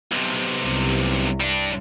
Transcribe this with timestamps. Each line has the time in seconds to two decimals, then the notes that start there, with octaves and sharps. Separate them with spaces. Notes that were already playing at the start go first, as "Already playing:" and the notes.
0.12 B1 C3
0.66 C2
1.40 G3 D4